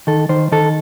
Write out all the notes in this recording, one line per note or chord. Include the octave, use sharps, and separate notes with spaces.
D#3 A4
D#3 C5
D#3 A4